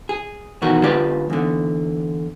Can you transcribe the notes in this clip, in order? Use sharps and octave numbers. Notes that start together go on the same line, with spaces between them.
G#4
E2 B2 D#3 F#4 A#4
D3 G#3 F4 G4 B4 D5
E2 D3